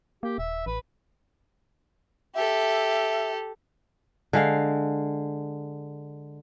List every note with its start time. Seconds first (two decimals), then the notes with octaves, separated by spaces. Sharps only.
0.23 A#3 G4
0.38 D#1 E5
0.66 A1 B4
2.35 G4 A4 E5
4.33 D3 G#3 F5